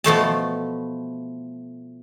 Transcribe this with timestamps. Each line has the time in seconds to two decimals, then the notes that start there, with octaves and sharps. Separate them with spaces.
0.04 B2 F3 A3 A5